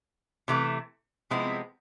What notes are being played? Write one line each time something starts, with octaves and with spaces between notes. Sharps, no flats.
C3 E3 A3
C3 F3 G#3 B3 C4 E4